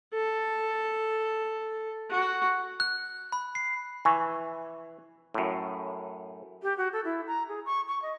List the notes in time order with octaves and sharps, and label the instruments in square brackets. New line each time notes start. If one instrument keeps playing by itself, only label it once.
[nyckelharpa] A4
F#4
[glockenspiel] F#6
B5
C7
[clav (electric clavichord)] E3 [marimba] G#5 C#6
[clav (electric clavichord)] F#2 A2
[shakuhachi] G4
F#4
A4
E4
A#5
G#4
C#6
C#6
D#5